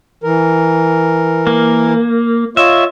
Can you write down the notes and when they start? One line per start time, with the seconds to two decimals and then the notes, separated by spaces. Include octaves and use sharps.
0.24 E3 A#4
1.47 A#3
2.57 F4 C#5 D#5 E5